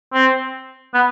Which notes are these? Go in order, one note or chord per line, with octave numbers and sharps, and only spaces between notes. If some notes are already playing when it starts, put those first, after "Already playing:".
C4
B3